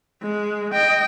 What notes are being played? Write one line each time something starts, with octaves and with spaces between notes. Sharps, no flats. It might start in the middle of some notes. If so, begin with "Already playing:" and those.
G#3
D#5 G5